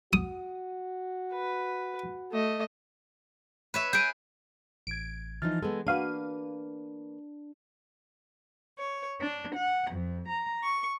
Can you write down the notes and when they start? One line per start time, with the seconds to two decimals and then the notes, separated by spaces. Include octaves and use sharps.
0.13 F#4 D#6
1.33 B4
2.32 A3 D#5
3.74 B4 C#5 E5
3.93 G#4 B4 G6 D7 D#7
4.87 A1 G#6 D7
5.42 E3 F3 D#4 F6 A6
5.63 G#3 B3 A4
5.87 A#3 D4 F#4 B4 F5 D#7
8.77 C#5
9.20 D4
9.55 F#5
9.91 F2
10.28 A#5
10.63 C#6